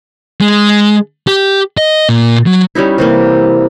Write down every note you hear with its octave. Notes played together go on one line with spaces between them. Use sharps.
G#3
G4
D#5
A#2
F#3
G3 C#4 D#4 E4
C3 E3 A#3